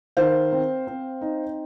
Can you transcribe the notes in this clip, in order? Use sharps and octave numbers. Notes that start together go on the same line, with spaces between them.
D#3 C5 F5
C4
C4
D#4